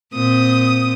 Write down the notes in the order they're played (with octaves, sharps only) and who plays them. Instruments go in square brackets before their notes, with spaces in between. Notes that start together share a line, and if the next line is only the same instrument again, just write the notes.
[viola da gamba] A#2 C4 [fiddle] D#6